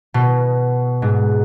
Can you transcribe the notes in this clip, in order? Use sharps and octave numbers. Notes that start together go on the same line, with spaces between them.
B2
G#2